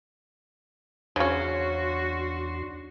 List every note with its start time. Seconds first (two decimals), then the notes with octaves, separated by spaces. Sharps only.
1.16 E2 C#3 C#4 D4 F#4 C6